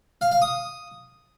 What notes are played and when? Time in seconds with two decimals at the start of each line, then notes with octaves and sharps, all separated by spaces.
0.21 F5
0.31 F5
0.42 D#6